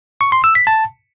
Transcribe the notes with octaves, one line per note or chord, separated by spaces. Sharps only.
C#6
C6
E6
B6
A5